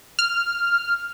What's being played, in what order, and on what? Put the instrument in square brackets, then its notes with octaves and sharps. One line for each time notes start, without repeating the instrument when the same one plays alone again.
[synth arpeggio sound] F6